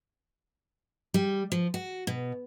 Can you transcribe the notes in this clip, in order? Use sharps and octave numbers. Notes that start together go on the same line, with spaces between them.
G3
F3
F#4
B2